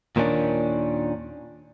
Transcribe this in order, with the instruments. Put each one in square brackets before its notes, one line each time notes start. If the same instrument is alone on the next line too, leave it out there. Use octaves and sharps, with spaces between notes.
[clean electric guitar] D#2 A#2 D#3 C#4 D4